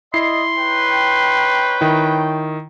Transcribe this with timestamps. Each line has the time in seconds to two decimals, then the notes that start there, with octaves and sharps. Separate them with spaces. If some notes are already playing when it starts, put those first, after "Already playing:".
0.14 E4 D5 D#5 C6 C7
0.58 D#4 B4 C#5 G5
1.81 D#3 E4